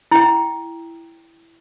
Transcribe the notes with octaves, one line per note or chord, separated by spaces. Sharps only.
E4 G5